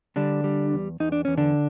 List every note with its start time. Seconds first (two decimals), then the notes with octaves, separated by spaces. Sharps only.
0.16 D3 G3 D4
0.44 G3
0.72 E2
1.00 E2 D#4
1.12 D4
1.25 E2 C#4
1.38 D3 D4